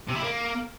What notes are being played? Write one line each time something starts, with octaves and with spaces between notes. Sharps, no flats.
C3
E4
A#3